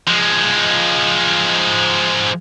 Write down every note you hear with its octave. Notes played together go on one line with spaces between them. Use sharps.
F3 G#3